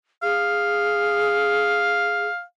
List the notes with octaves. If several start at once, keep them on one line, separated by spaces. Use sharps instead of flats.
G#4 F5